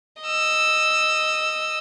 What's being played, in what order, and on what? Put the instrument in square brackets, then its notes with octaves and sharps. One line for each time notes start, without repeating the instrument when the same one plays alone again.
[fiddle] D#5 E6